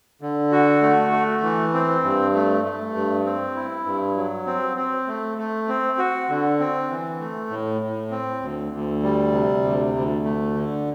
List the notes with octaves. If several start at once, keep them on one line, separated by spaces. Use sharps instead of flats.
D3
F#4
A3
A3
E3
C4
G2
A3
A3
G2
C4
E4
G2
F#3
C4
C4
A3
A3
C4
F#4
D3
C4
E3
A3
A2
A2
C4
D2
D2
G3
C3
D2
D2
A3
D3